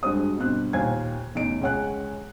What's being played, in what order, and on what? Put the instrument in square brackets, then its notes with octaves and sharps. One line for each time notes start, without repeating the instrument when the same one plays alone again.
[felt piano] G2 G#3 F#4 C5 D#6
G2 B2 C4 F#6
D#2 A#2 C5 F5 G#5 G#6
A1 E2 D#4 D7
C#2 G#3 C#5 F#5 G#5 F#6